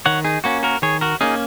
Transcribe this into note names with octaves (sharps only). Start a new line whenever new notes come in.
D#3 C#5 F#5
D#4 G#4
A#3 C#4 F#4
F#4 A#4
D#3 G#4 C#5
F#4 A#4
A#3 C#4 D#4 G#4